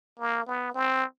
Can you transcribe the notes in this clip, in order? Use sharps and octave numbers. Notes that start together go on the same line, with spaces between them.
A#3
B3
C4